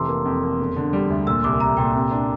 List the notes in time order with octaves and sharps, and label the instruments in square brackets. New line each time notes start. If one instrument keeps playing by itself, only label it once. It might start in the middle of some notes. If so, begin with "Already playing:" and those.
Already playing: [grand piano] F1 E3 [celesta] A5 A#5 C6 D6 E6
[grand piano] A#3
F2
A#3
E1
D3
G3
D2
[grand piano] A#2 [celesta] E6
[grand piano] C2 [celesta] D6
[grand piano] C2 [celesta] A#5
[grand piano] A#2 [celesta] G5
[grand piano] C3
D4